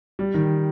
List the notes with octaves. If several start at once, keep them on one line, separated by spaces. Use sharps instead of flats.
G3
D#3